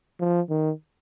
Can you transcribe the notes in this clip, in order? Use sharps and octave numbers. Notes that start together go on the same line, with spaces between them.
F3
D#3